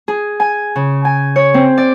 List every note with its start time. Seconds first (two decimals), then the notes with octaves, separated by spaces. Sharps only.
0.08 G#4
0.40 G#5
0.76 C#3
1.05 G#5
1.36 C#5
1.54 C4
1.78 D5